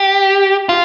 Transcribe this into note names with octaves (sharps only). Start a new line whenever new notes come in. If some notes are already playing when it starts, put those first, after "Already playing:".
Already playing: G4
F4